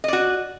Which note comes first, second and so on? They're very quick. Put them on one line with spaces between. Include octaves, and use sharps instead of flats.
D#5 D5 F#4